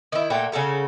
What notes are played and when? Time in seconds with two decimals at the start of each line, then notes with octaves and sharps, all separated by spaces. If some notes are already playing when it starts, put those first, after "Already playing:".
0.12 D#3 E4
0.30 A#2 A3 F#4 G5
0.52 C#3 F#4 A4 A#4